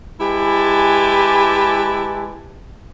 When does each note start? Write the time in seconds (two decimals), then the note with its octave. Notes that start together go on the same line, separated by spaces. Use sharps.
0.21 G#3 E4 G4 B4 G#5 A5